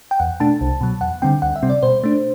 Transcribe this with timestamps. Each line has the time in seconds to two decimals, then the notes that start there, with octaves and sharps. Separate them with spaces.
0.11 G5
0.19 E2 F#5
0.40 B2 A3 D4 A5
0.61 C2
0.81 B2 F#3
1.01 E2 F#5
1.22 D3 G3 C4 G5
1.42 D2 F#5
1.56 E5
1.63 C3 G3 C4
1.70 D5
1.83 B2 C5
2.04 A3 D4